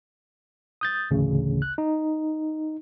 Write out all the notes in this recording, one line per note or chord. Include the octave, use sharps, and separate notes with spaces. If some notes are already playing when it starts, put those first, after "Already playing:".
D#6 G6 A6
A1 D2 C#3
F#6
D#4